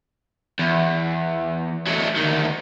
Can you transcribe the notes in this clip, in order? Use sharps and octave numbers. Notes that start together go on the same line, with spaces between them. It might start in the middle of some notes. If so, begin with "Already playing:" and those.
E2
F#3 A3
D2 D#3